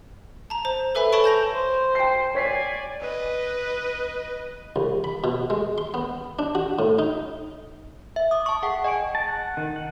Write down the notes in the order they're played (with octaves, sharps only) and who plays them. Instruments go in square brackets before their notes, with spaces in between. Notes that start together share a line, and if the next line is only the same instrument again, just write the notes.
[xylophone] A5 A#5
C5 A#5
A4 B4 E5 G#5 B5
A4 C#5 A5 B5 C#6 D7
A5 G6 A#6 F7
[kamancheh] C5
[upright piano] G5 C7
[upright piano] C#5 B6 C7 [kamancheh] D5 G#5
[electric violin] B4 D#5
[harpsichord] C2
B5
B2
G#3
C6
B3
D4
F#4
A2
D#4
[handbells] E5
D6 D#6
A5 C#6
G#4 F#5 G5
D#5 G#5 C#6 D7
[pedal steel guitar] A5
F#5
D#3
F#5